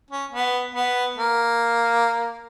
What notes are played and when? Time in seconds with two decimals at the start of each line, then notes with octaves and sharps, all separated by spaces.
0.10 C#4
0.32 B3
0.75 B3
1.17 A#3